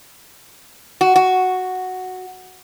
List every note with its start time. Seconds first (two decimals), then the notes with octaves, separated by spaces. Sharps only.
1.01 F#4
1.16 F#4